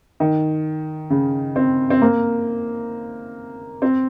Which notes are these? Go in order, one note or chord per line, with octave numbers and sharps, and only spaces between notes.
D#3
C#3
C4
C4
A#3
C4